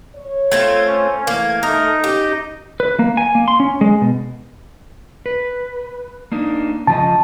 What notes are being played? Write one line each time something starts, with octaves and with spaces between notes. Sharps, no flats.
C#5
A3 C4 F4 G#6
C#4
E3 A3 A#3 G#6
A3 D#4 A#4 D#5
A#3 C#4 G4
B4
A#3
G#5
A#3
C6
C#4
G#3
B2
B4
A#3 D4 D#4
C#3 F3 D#5 A5